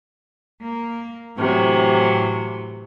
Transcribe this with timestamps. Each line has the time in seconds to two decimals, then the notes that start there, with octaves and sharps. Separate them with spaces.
0.62 A#3
1.36 A2 C3 E3 F#3